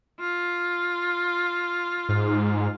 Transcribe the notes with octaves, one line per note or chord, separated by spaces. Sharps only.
F4
G#2